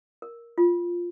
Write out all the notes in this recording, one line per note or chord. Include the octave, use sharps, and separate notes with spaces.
A#4
F4